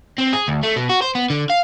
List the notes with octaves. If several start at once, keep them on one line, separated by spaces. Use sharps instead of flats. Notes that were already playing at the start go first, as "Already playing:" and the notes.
C4
G#4
D2
A3
B2
F#4
C5
B3
D3
F5